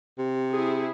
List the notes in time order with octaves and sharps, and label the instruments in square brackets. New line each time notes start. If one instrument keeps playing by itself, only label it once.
[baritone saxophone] C3
[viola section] E4 G#4